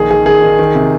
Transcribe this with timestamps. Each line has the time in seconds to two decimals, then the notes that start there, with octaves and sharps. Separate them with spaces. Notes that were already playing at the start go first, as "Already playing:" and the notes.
Already playing: A#1 D#3 G#4
0.10 D#3 G#4
0.26 D#3 G#4
0.42 D#3
0.59 D#3
0.75 C3